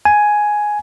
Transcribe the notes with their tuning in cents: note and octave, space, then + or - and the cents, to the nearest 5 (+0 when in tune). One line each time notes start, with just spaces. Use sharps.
G#5 +5